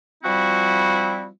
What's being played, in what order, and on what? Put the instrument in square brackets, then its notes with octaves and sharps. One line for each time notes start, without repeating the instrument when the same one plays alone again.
[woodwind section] F3 G3 C4 E4 F#4